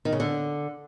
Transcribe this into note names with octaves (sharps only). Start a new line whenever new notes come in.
D#3
C#3
D3